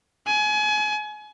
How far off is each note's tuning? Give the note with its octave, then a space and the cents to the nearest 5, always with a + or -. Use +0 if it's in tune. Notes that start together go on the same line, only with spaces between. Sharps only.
G#5 +30